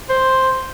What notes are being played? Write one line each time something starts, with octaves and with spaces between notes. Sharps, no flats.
C5